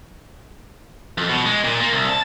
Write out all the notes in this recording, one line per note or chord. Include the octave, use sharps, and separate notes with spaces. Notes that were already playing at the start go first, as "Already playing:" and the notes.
F2
B2
G#3
A#2
A#3
C2
A5